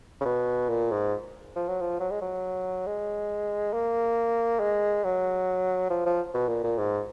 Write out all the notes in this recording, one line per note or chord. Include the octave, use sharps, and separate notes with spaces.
C#3
B2
A#2
G#2
F3
F#3
F3
F#3
G#3
F#3
G#3
A#3
G#3
F#3
F3
F3
B2
A#2
A#2
G#2